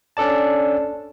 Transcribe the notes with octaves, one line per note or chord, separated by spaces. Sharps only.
C#4 D4 A4 D5 A5